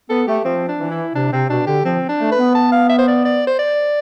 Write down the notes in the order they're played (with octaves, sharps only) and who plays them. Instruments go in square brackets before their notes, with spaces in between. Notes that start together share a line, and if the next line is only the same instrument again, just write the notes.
[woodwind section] B3 [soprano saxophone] A4
[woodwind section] A3 [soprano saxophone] G4
[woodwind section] F3 [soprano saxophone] C4
[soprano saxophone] D4
[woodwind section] E3
[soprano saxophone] E4
[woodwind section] C3 [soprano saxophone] D4
[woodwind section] C3 [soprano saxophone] C4
[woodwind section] B2 [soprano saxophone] D4
[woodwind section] D3 [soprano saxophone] G4
[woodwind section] F3 [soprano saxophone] C4
[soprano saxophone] D4
[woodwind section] A3
[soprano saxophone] B4
[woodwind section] B3
[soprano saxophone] A5
F5
E5
C5
D5
D5
C5
D5